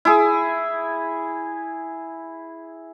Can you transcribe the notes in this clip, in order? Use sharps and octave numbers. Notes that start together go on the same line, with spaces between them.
E4 G#4